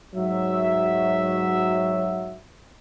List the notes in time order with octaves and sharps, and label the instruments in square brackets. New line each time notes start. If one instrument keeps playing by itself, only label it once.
[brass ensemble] G#2 F#4 E5 [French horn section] F#3